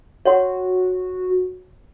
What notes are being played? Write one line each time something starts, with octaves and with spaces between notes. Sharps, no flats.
F#4 C#5 F#5 C6